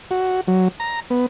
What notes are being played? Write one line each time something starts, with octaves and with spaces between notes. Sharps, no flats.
F#4
F#3
A#5
B3